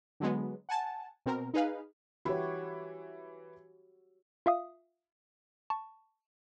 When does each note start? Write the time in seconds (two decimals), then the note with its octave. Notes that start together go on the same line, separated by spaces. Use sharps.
0.20 D3 F#3 G#3 B3
0.69 F#5 G#5 A5
1.26 B2 C4 A#4
1.54 D#4 G#4 B4 F5
2.25 E3 F#4 G4 C#5 E5 B5
4.46 F4 E5 F5 D#6
5.70 A5 C#6